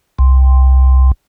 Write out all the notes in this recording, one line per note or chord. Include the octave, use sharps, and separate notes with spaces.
C2